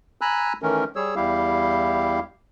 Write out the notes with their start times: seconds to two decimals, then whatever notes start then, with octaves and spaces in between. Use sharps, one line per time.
0.21 G#5 A#5 B5 E6 F#6
0.62 D#3 E3 A3 C#4 A#4
0.96 G3 G#4 C#5 E6
1.16 E2 G3 E4 G4 F5